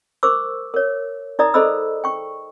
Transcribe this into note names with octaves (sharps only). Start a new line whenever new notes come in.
A#4 C5 C#6 D6 E6
A#4 C#5
D#4 A#4 D5 E5 A#5 D#6
G#4 A4 C5 D#5 B5 E6
G5 C#6